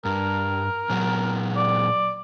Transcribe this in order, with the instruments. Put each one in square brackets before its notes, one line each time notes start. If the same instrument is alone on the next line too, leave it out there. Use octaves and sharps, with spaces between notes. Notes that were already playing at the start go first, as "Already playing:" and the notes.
[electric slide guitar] G2 [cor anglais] A#4
[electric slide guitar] A#2 F#3
[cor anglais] D5